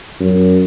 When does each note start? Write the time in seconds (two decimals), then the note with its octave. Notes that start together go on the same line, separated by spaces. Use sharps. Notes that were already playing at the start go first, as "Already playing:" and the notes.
0.20 F#2